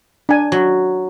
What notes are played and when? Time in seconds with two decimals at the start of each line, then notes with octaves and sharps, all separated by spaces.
0.29 D4 G#5
0.52 F#3